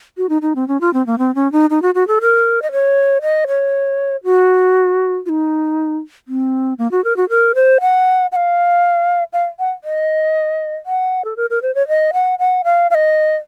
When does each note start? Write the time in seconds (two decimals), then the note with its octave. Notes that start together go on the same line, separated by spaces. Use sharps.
0.17 F#4
0.29 D#4
0.42 D#4
0.56 C4
0.68 C#4
0.81 F4
0.93 C4
1.07 A#3
1.18 C4
1.35 C#4
1.52 D#4
1.70 D#4
1.82 F#4
1.95 F#4
2.08 A4
2.21 A#4
2.62 D#5
2.72 C#5
3.22 D#5
3.48 C#5
4.24 F#4
5.26 F4
5.29 D#4
6.28 C4
6.78 A#3
6.91 F#4
7.04 A#4
7.17 F#4
7.29 A#4
7.55 C5
7.81 F#5
8.32 F#5
8.36 F5
9.33 F5
9.59 F#5
9.84 D#5
10.86 F#5
11.25 A4
11.37 A#4
11.50 A#4
11.62 C5
11.75 C#5
11.88 D#5
12.13 F#5
12.39 F#5
12.64 F5
12.90 F5
12.95 D#5